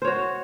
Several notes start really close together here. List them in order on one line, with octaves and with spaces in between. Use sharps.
C5 C#5 F#4